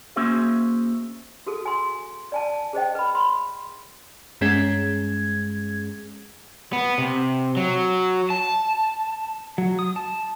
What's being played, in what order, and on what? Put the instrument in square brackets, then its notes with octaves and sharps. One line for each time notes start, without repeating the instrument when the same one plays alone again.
[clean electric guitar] A#3 C#4 F#4 G#4 C5 E5
[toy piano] F#4 G#4 A4
G#5 C6
D5 G#5 A5
G#4 C5 D#5 G5
B4 B5
B5 C6
[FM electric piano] G2 G#3 C#4 G#4 G#6
[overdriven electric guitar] B3
C3
F#3
A5
[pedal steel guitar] F#3
D#6
A5